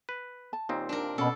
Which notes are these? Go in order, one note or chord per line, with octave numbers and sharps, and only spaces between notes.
B4
A5
D#2 A#2 C4 D#4
D4 A#4
B2 C#4 A4 B5